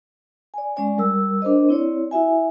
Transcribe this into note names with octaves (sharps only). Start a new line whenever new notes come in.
D5 G#5
G#3 C#4 D5 G#5
G3 A#4 E6
D4 A#4 C5 D#5
C4 E4 C#5 D5
E4 F#4 E5 G#5